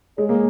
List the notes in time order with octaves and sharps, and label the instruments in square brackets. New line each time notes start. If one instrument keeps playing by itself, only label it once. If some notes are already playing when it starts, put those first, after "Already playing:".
[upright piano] G#3 [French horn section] G#4 C#5
[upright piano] A#3